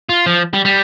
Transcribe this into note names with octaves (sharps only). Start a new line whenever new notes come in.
F4
F3
G3
G3